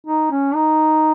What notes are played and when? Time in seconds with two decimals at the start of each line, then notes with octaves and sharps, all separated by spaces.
0.06 D#4
0.31 C#4
0.55 D#4